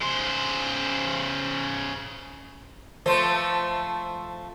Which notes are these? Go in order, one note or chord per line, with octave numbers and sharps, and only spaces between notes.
C#3 C5
F3 A3 C5